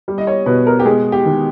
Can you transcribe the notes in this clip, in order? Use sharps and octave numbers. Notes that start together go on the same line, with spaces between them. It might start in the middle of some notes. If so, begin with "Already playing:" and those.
G3
D#5
C#5
B2 B4
A#4
G4
G#3 G#4
G4
D#3